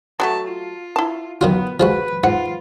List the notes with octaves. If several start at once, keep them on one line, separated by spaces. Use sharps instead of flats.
F#3 G3 A3 A5
F4
E4 A5
D#3 F#3 B3 F4
F3 G#3 F#4 B4
G#2 F4 F#5